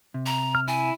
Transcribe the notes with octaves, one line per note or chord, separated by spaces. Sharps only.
C3
A#5
F6
E4 G#5